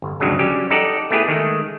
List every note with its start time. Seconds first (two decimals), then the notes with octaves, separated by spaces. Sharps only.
0.02 G1
0.20 D2 G2 C#3 F#3 G#3
0.39 F#3 G3 C#4 G4
0.71 D#4 G4 A4 D5 D#5 F#5
1.10 A3 B3 E4 G4 G#4 B4
1.28 D#3 G#3 A3